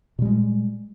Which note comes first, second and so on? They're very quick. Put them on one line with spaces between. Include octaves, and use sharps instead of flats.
A#2 G3 G#3